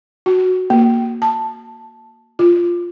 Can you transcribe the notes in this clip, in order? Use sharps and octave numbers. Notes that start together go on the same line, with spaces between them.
F#4
A#3
A5
F4